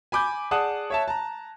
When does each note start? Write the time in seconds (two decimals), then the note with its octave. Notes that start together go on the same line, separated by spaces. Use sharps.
0.12 G#5 B5 D6 G6
0.51 G#4 D5 F#5 A5 D#6 F#6
0.90 C#5 E5 A5
1.08 A5 A#5